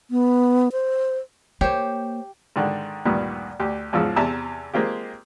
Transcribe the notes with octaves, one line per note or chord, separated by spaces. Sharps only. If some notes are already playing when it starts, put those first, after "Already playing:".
B3
C5
A#3 G4 C5 C#5
G#2 D3 D#3
D2 G2 A#2 D#3 G3 B3
D2 G4
E2 G#2 C#3 F3 E6
E2 C3 E5 A5 A#5 E6
G#3 A#3 C4 F4 G4